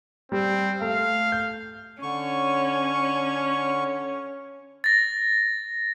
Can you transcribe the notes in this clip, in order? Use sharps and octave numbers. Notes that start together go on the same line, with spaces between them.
G3 C4
A3 F5
G6
D3 C#4 C#5 C#6
A6 A#6